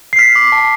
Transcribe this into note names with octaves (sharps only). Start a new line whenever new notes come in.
C7
F6 B6
D6
A5